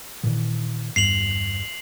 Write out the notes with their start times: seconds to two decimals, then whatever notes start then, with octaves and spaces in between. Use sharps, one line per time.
0.23 A#2 D#3 E3
0.96 G1 E2 G2 C7 F7 F#7